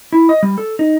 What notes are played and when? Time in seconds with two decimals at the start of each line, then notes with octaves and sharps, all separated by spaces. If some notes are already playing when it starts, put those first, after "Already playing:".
0.12 E4
0.29 D#5
0.43 G3
0.58 A4
0.79 D#4